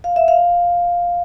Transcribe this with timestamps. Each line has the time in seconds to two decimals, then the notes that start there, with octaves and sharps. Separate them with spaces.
0.04 F5
0.16 E5
0.28 F5